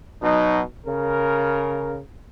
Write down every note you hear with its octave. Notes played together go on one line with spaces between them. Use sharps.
B2 F#3 D#4
C#3 A#4